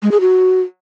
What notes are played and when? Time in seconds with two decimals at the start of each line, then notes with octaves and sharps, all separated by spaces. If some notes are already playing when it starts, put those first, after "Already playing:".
0.03 G#3
0.11 G#4
0.20 F#4